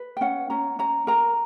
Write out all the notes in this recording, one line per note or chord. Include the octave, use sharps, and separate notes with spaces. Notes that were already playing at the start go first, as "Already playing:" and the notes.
Already playing: B4
G5
C#4 F#5
C#4 A#5
C#4 A#5
A#4 A#5